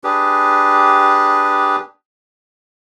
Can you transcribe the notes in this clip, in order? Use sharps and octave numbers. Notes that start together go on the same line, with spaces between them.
D4 G4 G#4 B4